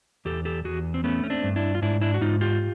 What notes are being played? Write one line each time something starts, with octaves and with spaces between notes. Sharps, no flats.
E2 G4 A4
G4 A4
E2 F#4 G#4
C4
A3 B3 C#4
C#4
C4 D4
G2
D4 E4
F4
G#2 D4 E4
D4 E4
F#4
G#2 D#4 F4
F4 G4